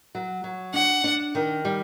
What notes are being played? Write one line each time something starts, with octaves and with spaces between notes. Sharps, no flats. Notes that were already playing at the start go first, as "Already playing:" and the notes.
F#3
F#3
D4 F#5
D4
D#3
G3